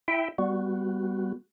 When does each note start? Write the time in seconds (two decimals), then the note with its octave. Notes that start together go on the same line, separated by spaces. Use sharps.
0.08 E4 E5 G5
0.38 G3 B3 F#4